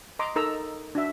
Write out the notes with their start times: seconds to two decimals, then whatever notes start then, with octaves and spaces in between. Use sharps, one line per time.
0.19 D#5 A#5 C6 D6
0.36 D#4 A4 A#4 A#5 E6
0.95 D4 F#4 E5